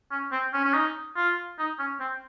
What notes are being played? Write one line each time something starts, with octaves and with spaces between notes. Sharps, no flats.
C#4
C4
C#4
C#4
D#4
F4
D#4
C#4
C4